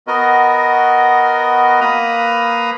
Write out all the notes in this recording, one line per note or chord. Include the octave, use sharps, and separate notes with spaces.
B3 F#4 A#4 D#5
A#3 B4 A#5 D#6